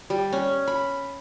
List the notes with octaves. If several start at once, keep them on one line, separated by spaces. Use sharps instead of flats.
G3
C#4
B5